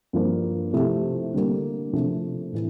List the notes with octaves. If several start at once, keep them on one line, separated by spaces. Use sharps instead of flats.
G2 F3 A#3
C3 F3 A3 E4 G4
D3 G3 A#3
C3 F3 A3 D4
A2 E3